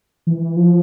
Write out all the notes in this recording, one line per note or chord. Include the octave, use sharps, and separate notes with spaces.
E3
F3